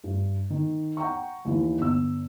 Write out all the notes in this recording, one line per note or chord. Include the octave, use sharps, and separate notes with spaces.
G2
D#3
F#5 G5 A#5 C#6
D#2 D#3 E3
G1 E6